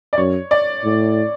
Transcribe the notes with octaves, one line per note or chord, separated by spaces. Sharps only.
D5
F#2 C#5
D5
A2